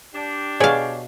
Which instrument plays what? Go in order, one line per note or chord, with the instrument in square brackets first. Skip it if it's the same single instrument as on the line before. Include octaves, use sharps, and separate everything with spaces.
[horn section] D4 G4
[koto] B2 F5 [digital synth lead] G#4 [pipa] C#5 D5 G#5